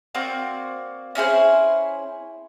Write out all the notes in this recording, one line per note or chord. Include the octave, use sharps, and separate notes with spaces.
A#3 C4 F#4 D5
C#4 E4 G#4 C5